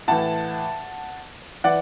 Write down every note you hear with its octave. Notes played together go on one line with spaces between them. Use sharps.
A2 E3 F#5 A5
E3 D5 F#5